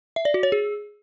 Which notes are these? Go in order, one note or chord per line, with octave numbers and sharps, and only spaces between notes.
E5
D5
F#4
C#5
G#4